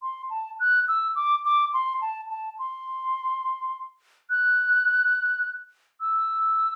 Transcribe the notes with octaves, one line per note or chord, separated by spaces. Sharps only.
C6
A5
F#6
E6
D6
D6
C6
A5
A5
C6
F#6
E6